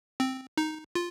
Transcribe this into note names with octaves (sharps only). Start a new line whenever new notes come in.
C4
D#4
F4